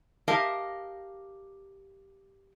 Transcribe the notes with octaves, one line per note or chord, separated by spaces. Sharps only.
G4 A#4 D#5 F5 A5